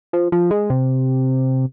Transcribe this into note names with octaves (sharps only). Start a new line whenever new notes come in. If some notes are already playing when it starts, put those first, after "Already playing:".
F3
F3
G#3
C3